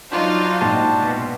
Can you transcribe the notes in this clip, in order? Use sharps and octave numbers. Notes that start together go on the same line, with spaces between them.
F#3 D4 D#4 F4 F#4 C5
A#1 G#2 A5 C6
B2